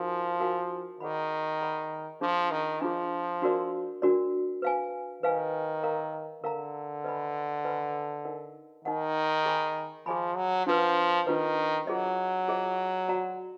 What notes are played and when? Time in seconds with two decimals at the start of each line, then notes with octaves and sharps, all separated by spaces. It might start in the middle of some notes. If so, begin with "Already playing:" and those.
Already playing: F3 D#4 F#4 A#4 F5 G#5
0.40 D#4 F#4 A#4 F5 G#5
1.00 D#3 G#4 D5 F#5 B5
1.61 G#4 D5 F#5 B5
2.21 F3 D4 F4 G#4
2.51 D#3
2.81 F3 D4 F4 G#4
3.42 D4 F#4 A#4 D5
4.02 D4 F#4 A#4 D5
4.62 B4 F5 G#5
5.23 D#3 B4 F5 G#5
5.83 A#4 F5 A#5
6.44 D3 A#4 F5 A#5
7.04 B4 D#5 G#5 B5
7.65 B4 D#5 G#5 B5
8.25 D#4 A#4 D#5 F#5
8.85 D#3 D#4 A#4 D#5 F#5
9.46 G#4 D#5 G#5 B5
10.06 F3 G#4 D#5 G#5 B5
10.36 F#3
10.66 F3 D4 F4 B4
11.27 D#3 D4 F4 B4
11.87 F#3 F4 G#4 D#5
12.48 F4 G#4 D#5
13.08 F#4 D5 F#5 A#5